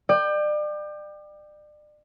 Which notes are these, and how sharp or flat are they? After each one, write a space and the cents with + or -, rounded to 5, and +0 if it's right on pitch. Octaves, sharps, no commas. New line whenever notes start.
D5 +35 G5 +5